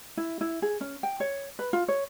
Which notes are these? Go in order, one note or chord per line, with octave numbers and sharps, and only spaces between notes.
E4
E4
G#4
C#4
G5
C#5
B4
F4
C#5